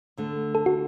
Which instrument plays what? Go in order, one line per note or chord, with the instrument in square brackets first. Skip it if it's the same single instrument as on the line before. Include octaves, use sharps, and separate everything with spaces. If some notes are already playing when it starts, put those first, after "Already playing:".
[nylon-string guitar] D2 D3 A3
[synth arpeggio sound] A4
F#4